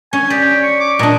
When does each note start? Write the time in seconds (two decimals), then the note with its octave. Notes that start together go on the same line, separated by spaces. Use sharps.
0.13 C#4 G#5
0.30 G4 D5
0.63 C#6
0.80 D6
0.99 A#2 D4 D#5